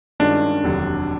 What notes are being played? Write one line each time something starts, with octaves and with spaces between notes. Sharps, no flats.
G2 D#3 G#3 C#4 D4 F4
F1 D#2 D3 F#3